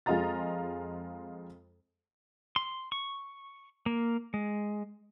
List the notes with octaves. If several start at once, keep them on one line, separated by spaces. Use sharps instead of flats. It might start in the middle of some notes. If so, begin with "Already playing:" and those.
F2 G#3 F4 D#5 A#5 A6
C6
C#6
A#3
G#3